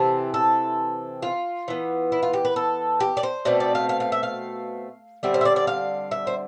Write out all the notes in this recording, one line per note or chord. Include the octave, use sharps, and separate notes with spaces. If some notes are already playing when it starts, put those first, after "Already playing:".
Already playing: C3 E3 C4 A4
A4
F4
E3 B3
E4
F4
G4
B4
A4
G4
D5
C5
B2 A3 C4 D5
D5
F5
F5
F5
E5
F5
D3 G3 C4 E5
C5
E5
D5
D5
F5
E5
C5